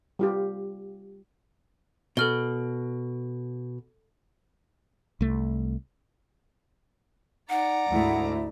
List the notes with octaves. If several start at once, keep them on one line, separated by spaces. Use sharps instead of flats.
G3 F4 G4
B2 A4 F6 G7
C2 A3
D#4 D5 F#5 A#5
D2 G#2 A3 E4